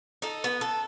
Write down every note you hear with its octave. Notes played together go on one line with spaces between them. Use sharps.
D#4 A4
B3
A4